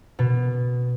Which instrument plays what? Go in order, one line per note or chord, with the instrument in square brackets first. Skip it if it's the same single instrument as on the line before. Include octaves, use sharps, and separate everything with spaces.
[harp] B2